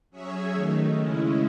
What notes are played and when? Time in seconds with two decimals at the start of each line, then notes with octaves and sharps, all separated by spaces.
0.10 F#3 C#4 G#4 C#5 E5
0.53 D#3 A3 D#4
0.96 C#3 G#3 C#4 E4